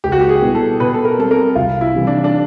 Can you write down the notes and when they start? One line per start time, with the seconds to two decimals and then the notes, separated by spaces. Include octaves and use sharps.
0.04 C#2 G4
0.12 F#4
0.21 G4
0.29 G#4
0.42 B2 G3 B3 E4
0.55 A4
0.80 B2 B4
0.94 A4
1.05 A#4
1.18 G3 C4 A4
1.31 A#4
1.56 C2 F4
1.81 E4
1.94 C3 E3 G3
2.07 D4
2.24 D4